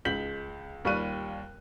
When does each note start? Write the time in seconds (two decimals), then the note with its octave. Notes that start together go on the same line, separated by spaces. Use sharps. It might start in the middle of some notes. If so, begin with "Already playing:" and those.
0.05 C#2 G#3 G6 B6 F#7
0.85 D#2 G3 F4 C#6 F#6 D#7